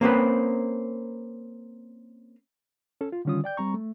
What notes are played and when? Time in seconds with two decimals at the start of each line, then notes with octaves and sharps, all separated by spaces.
0.01 A#3 C4 C#4 B4
3.01 C#4 A4
3.12 F4
3.25 D3 D#3 G3 C#4 F4 D#6
3.44 D5 G5 G6
3.57 G3 C4 A#5 C#6
3.74 A3